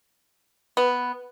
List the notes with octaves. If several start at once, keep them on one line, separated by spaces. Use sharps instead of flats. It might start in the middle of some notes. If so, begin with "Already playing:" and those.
B3